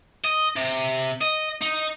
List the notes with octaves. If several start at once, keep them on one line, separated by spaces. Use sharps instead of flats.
D#5
C3
D#5
D#4